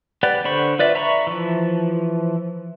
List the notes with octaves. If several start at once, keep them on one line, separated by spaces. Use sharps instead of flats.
G4 B4 D5 F#5
D3 C5 B5 C#6
F4 B4 D5 E5
E5 A#5 B5 C#6
E3 F3